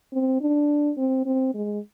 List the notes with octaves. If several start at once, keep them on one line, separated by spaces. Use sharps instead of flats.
C4
D4
C4
C4
G#3